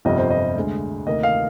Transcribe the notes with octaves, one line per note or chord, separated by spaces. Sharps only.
G1 F2 C3 G3 D#5
C5
D#5
D2 D3 G#3
D2 C3 D#3 A#3 D#5
F5